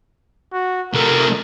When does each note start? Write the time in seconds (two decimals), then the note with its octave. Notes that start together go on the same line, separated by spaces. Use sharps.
0.53 F#4
0.94 C3 A3 A#4